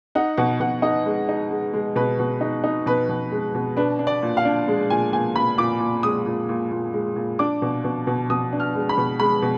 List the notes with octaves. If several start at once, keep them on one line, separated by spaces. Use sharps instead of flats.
D#4 F#5
B2 F#5
B2 F#5
D#4 D#5
G#3
D#4
G#3
G#3
B2 B4
B2
D#4
D#4
B2 B4
B2
G#3
B2
D4 B4
D4
D5
A#2
F5
D4
G#3
A#2 G#5
A#2 G#5
A#2 B5
A#2 D6
A#2
G#3 D#6
A#2
A#2
A#2
G#3
A#2
D4 D6
B2
B2
B2
B2 D#6
D4
F6
G#3
B5
B2
G#3 B5
B2